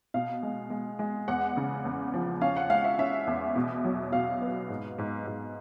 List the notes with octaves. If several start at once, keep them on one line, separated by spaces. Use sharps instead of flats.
B2 F5
G#3
G#3
G#3
E2 F#5
C#3
E2
F3
C#4 F5
F#5
G#3 F5
E5
C#4 E5
E2
B2
F#3
B2 F5
B3
G#2
G#2
G#2